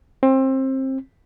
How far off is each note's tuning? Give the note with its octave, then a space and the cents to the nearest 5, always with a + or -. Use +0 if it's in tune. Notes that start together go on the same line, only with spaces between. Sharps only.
C4 +25